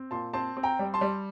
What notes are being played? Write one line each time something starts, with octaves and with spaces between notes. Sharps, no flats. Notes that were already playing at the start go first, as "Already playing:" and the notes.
Already playing: C4
A#2 A5 C6
C4 A5 C6
C4
G5 A#5
G3
A5 C6
G3